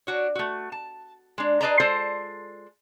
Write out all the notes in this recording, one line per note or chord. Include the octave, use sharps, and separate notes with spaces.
D4 F#4 C#5
A3 F#4
A5
G#3 D4
G#4 B4 D5 D#5 A5 A#5
G#3 F4 A4 C5 D5 A5